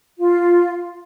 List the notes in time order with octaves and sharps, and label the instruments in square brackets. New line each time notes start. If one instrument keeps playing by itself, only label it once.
[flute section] F4